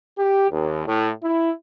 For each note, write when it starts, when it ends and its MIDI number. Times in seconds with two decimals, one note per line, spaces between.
0.18 0.48 67
0.51 0.83 39
0.87 1.10 45
1.24 1.50 64